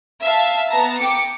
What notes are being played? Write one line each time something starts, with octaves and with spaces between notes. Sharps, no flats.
E5 F5 A5
B3 A5 A#5
G5 D6 C#7